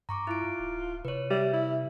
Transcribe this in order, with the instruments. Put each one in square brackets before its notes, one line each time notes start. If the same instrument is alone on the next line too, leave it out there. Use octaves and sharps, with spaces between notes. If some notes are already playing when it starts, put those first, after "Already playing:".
[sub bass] G2 [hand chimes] A#5 C#6 D6
[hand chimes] E4 D7 [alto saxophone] F4
[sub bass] D1
[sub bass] C3 [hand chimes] B4 C#5
[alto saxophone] G3 [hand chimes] E5
[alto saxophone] E4